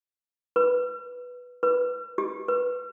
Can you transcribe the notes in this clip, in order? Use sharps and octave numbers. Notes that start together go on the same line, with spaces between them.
B4
B4
G4
B4